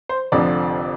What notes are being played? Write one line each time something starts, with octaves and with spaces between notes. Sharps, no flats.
C5
F1 F2 D3 F3 D5